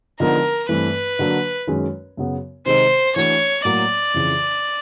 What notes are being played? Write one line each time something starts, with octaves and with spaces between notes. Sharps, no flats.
D3 F3 G#3 B3 D#4 A#4
G2 E3 A3 C4 B4
D3 F#3 A#3 D4 F#4
F#2 D#3 G#3 C#4
F#2 C#3 F#3 B3
C3 D#3 G#3 C4 D#4 C5
E3 A3 D4 F#4 C#5
A2 F#3 A#3 D5
F2 C#3 E3